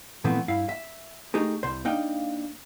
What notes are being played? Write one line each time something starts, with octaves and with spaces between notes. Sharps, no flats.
A#2 E3 F3 A3 B3 C4
G2 E4 F5
E5
A3 D#4 G4 G#4
C2 C5
A#3 D4 D#4 F5 G5